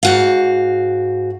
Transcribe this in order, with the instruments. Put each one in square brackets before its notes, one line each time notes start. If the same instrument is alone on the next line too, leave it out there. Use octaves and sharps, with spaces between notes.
[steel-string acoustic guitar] G#2 F#4 F5